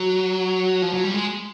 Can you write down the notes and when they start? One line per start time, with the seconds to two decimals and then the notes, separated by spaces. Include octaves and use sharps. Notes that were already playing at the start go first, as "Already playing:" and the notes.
Already playing: F#3
0.82 F3
0.94 F#3
1.04 G3
1.14 G#3